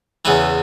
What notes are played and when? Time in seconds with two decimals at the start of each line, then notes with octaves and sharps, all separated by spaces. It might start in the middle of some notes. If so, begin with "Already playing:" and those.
0.25 E2 C#3 E3 B4